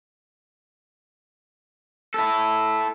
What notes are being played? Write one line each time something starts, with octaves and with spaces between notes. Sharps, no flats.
E4 A4